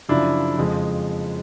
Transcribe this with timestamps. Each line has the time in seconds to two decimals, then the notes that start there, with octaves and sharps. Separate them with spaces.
0.09 F#2 C#3 F3 D4 E4
0.57 F2 C#3 F3 G#3